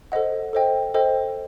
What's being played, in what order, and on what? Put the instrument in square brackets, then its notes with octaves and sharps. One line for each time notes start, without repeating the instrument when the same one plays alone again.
[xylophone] A4 C5 D#5 F#5
A4 C5 D#5 G5
A4 C5 D#5 G5